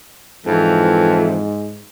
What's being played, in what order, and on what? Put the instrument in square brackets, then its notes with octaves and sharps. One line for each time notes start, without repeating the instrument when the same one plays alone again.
[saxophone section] F2 E3 [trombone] G#2